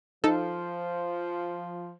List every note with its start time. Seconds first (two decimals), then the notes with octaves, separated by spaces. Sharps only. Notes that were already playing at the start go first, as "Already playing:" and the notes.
0.24 F3 D#4 A4